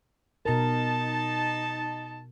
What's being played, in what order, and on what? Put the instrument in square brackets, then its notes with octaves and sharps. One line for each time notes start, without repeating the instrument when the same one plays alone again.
[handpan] B2 A#4 [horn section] D#4 A5